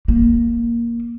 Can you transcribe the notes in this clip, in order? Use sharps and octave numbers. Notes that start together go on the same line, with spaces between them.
A#3